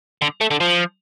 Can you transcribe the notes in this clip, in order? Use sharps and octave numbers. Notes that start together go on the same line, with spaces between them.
D3
A3
D3
F3